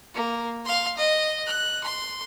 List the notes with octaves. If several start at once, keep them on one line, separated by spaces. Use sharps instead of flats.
A#3
F5 C6
D#5
F#6
C6